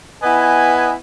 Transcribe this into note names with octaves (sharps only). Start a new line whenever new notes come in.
B3 E4 B4 D#5 G#5